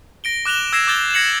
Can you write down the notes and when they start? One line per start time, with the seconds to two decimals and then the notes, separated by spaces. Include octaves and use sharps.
0.24 A#6 D7 G7
0.45 D6 F#6 E7 F7 G7
0.73 E6 G#6 A#6 C7 E7
0.87 D6 G6 A6 G7
1.14 G#6 A#6 C7 C#7 E7 F#7